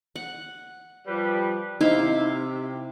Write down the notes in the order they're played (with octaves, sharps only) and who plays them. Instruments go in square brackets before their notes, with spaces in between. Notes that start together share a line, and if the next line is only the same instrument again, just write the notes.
[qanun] F#5
[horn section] F3 G3 B4
[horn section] C3 [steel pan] D#4 [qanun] E4 C5 F5